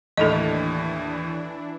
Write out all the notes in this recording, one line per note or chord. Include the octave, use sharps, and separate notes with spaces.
D#2 A2 E3 D4 E4 A4 D#5